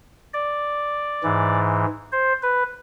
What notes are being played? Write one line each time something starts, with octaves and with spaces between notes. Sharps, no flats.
D5
G#2 E3
C5
B4